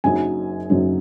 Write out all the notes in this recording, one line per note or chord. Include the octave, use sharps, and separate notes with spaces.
F#1 F#2 F#3 D#4 G#5
F#1 F#2 F#3 D#4